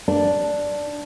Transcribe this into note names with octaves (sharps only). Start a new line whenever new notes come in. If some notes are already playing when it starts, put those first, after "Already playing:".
D4